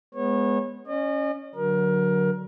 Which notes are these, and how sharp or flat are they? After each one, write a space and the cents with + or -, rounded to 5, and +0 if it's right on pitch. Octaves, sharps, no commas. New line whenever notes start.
G#3 +0 B3 +0 C#5 -30
C#4 +0 D#5 -40
D3 +0 F#3 +0 A#4 +25